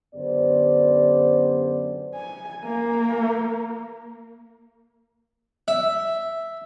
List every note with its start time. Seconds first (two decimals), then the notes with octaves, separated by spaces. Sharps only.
0.15 F#2 D3 B3 G4 C5 D5
2.15 G#5
2.65 A#3
5.68 E5